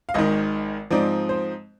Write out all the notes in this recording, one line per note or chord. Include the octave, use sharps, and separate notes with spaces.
F5
G#1 G#2 D#3 D#5
G#2 F3 C4 D#4 D5
C5